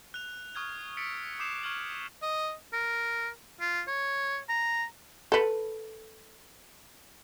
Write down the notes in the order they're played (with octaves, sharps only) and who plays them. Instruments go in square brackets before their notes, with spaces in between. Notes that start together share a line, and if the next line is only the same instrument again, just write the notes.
[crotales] F#6 F7
C#6 D#6 F6 G#6 F7
E6 A6 B6 C#7 D7
D6 D#6 G6 C7 E7 F7
C#6 F6 G#6 F#7
[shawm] D#5
A#4
F4
C#5
A#5
[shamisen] A4 B4